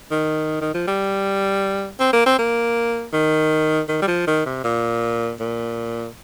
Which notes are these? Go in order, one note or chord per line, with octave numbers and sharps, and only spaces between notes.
D#3
D#3
F3
G3
C4
A#3
C4
A#3
D#3
D#3
G3
F3
D#3
C3
A#2
A#2